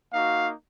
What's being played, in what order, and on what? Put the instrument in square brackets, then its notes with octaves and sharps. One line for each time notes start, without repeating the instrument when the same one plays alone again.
[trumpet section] A#3 D#4 F#4 F5